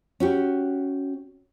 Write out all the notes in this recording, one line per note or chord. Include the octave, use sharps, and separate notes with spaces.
C#4 F#4 G4